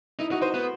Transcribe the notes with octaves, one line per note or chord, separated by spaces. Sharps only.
D#4 E4
D#4 F#4
D#4 C5
B3 B4